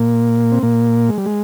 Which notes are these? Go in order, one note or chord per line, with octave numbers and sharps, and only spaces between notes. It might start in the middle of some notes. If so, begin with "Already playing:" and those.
Already playing: A#2 A#3
C4
A#2 A#3
G#3
G3
G#3